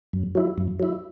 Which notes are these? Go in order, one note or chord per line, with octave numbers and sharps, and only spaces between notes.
F#2
F#3 E4
F#2
F#3 E4